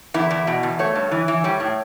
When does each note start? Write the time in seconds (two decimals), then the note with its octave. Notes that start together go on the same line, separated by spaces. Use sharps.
0.14 E2 E4
0.31 E2
0.47 B2
0.63 E2
0.79 A3 C#5
0.95 G2
1.11 E3
1.28 E3
1.44 G3 C#5
1.60 A2